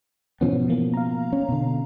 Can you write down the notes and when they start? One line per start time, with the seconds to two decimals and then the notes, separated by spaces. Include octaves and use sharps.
0.41 G#2 B2 E3 F3 B3 C#4
0.68 C#3 E3 A#3
0.94 F5 A#5
1.33 C#4
1.49 B2 D3